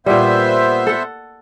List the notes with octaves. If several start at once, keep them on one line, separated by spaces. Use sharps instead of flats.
A#2 G3 B3 C5 E5
A4 F#5